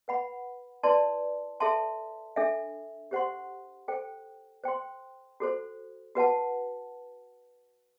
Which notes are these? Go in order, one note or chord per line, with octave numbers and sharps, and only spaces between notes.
B4 F#5 B5
E4 B4 D5 A5 C6
A4 E5 A5 C6
D4 A4 E5
G4 C5 F#5 C6
A4 C5 G5
C5 G5 C6
F#4 A4 C5
F#4 B4 F#5 A5